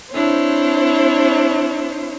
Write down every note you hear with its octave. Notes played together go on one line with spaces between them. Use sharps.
C4 D4 E4 C5 C#5